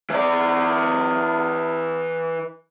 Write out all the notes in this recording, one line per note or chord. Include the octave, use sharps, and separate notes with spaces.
E3 D5